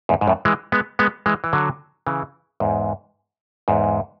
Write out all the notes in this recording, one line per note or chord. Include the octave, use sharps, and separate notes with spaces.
E2 G#2
G#2
F#2 A2
E3 G#3
G#3 B3
G#3 B3
E3 G#3
E3
D3 F#3
C#3 E3
E2 G#2
E2 G#2